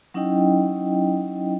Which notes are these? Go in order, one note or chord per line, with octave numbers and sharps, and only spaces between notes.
F#3 C#4 D#4 E4 D#5 G5